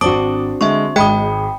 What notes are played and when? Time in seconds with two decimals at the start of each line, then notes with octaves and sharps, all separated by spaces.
0.01 G#1 C4 D4 F#4 A5 D6 D#6 D7
0.61 D3 G#3 E5 C#6
0.96 G#1 G#3 G5 B5 D#6 C#7